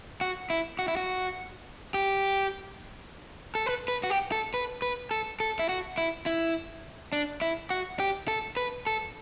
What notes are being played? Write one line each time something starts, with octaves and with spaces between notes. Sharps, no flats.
F#4
E4
F#4
E4
F#4
G4
A4
B4
B4
F#4
G4
A4
B4
B4
A4
A4
E4
F#4
E4
E4
D4
E4
F#4
G4
A4
B4
A4